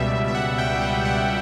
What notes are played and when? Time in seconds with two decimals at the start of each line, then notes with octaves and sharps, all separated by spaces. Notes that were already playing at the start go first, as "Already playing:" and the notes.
Already playing: C#2 B2 G3 E5
0.10 C#2
0.28 E5
0.35 B2 F#5
0.58 C#2 G5
0.81 G3 F#5
1.05 C#2 F#5